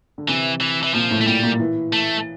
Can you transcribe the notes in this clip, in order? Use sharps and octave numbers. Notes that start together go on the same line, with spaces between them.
D3
C3 E3
E3
E3
A#2 F3
A2
A3
A#2 G3
A#2
E3
A3